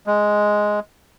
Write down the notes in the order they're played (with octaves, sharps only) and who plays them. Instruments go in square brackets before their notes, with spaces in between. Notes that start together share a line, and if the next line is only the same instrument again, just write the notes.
[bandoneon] G#3